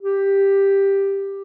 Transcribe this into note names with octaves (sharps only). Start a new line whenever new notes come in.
G4